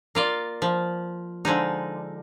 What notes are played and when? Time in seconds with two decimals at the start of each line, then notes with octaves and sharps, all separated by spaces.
0.15 A#3 F4 D5
0.62 F3
1.45 D3 F3 G#3 D#4